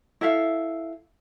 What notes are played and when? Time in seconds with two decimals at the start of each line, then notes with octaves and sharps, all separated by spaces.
0.21 E4 A4 E5 F5